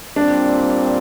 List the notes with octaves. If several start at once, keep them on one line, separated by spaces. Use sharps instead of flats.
A#2 G3 C4 D4